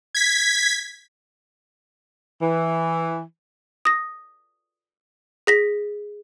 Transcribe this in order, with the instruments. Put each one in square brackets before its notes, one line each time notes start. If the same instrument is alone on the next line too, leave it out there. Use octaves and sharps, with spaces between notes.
[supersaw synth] G#6 B6
[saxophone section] E3
[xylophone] D#6 A#6
G#4 A#6 B6